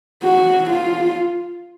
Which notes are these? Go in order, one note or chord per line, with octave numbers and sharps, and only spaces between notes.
F#4
F4